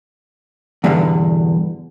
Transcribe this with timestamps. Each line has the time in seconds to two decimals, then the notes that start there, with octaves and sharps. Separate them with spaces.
0.84 E2 G2 B2 D3